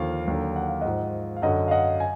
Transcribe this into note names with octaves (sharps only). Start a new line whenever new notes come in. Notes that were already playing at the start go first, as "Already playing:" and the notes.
Already playing: D#2 D3 F3 F5
D#2 D3 F#3
F#5
F5
G#2 F3 D#5 F#5
F5
F#2 D3 F#3 D#5 F#5
F5
D#5 F#5
G#5